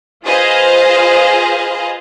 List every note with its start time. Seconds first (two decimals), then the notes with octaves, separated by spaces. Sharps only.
0.24 F4 G#4 B4 C5 D#5 F5